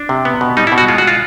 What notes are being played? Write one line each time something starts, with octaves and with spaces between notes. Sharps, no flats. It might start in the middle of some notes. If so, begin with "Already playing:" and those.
Already playing: D4
C3
B3
B2
G3 D#4
E4
B2
F#4
G#3 F4
F#4
F4